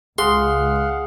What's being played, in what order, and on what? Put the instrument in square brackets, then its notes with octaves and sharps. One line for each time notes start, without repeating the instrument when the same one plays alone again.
[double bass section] C#2 [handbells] G#4 [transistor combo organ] F5 F#5 [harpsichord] C6